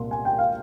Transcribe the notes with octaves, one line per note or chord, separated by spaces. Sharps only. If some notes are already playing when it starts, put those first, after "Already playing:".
Already playing: C2 A#2 A#3 C6
G#5
G5
F5